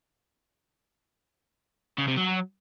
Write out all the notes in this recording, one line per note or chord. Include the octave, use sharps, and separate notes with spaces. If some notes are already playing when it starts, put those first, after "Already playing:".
C#3
C3
F#3